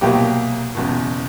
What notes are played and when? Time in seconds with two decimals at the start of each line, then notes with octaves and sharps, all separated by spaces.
0.01 C2 B2 F#3 A#3 G4 G5
0.75 F#1 E2 B2